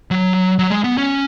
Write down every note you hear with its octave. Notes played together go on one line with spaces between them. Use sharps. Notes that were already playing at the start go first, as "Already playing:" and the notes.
F#3
F#3
G#3
B3
C#4